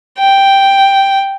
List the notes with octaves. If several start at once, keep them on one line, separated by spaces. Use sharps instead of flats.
G5